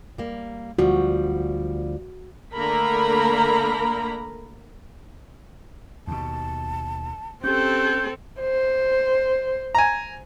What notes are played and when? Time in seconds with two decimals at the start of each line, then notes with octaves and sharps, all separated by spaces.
0.18 G3 A#3
0.78 D2 F3 G3 F#4
2.54 D3 A3 A#3 A#4 A#5 B5
6.07 D#2 B2 A5
7.44 C4 C#4 G4 A4 G6
8.40 C5
9.75 G#5 A#5